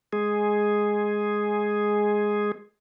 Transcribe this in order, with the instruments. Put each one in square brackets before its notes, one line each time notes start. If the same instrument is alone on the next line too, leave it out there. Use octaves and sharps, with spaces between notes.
[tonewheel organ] G#3 G#4